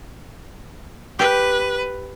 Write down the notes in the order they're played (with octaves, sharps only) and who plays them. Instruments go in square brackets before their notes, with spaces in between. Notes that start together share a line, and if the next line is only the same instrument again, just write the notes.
[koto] G4 [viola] B4